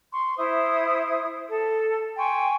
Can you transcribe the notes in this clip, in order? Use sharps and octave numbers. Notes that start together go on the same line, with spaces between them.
C6 C#6
E4 C5 E5 D#6
A4
G5 G#5 C6 C#6